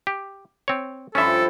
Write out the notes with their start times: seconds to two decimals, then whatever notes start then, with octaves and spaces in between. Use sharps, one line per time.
0.07 G4
0.68 C4 C#5
1.15 G2 F3 C#4 E4 A4 E5